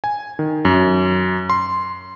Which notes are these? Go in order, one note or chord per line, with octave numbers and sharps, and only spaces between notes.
G#5
D#3
F#2
C6